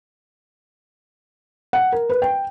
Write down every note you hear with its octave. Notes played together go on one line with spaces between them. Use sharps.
F#5
A#4
B4
G5